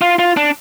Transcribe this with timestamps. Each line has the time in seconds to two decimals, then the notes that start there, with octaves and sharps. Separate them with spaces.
0.01 F4
0.19 F4
0.37 D4